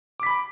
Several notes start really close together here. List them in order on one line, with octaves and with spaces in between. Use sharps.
D6 B6 B5